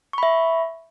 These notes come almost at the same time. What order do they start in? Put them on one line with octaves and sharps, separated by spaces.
C#6 B5 E5